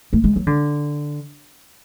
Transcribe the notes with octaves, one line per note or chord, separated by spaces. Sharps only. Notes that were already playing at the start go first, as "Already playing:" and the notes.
A3
G#3
F#3
D3